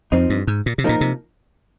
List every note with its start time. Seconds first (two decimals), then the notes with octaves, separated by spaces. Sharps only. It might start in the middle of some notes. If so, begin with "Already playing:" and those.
0.12 F2 F3 C4 D#4
0.30 G2
0.47 G#2
0.66 A#2
0.78 C3
0.84 A#2 F3 A#3 D#4 A#4
1.01 C3